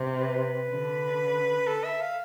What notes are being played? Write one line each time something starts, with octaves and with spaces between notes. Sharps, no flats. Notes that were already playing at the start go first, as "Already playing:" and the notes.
Already playing: C3
B4
D3
A4
E5
F5